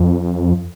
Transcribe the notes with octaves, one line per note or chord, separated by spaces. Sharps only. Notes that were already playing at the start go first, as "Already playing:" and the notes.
Already playing: F2